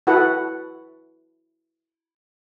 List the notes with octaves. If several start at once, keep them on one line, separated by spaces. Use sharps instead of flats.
E4 F#4 A4 B4 F#5